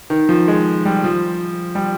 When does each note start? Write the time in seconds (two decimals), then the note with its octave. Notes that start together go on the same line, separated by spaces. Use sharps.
0.10 D#3
0.29 F3
0.48 G#3
0.85 G3
1.04 F3
1.75 G3